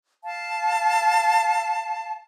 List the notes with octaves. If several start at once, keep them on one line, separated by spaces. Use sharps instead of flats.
F5 A5